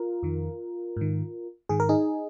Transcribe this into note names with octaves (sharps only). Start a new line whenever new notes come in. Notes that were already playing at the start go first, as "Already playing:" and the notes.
Already playing: F4 A#4
F2 D#3
G#2 D#3
G#2 D#3 G#4
A#4
D#4 G#4